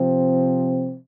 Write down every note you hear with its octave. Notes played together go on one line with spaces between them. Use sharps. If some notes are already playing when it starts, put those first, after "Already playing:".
Already playing: C3 F3 C4